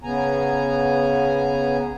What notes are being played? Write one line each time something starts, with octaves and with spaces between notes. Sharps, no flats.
C#3 B3 G#5 A#5